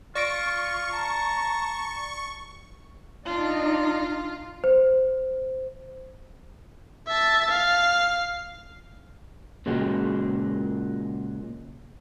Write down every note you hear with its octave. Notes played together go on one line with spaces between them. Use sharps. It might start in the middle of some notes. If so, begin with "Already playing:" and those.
F4 D5 C#6 A#6 D7
A5 A#5
D4 D#4 F4
C5
E5 A5
F5
A#2 C#3 F#3 G#3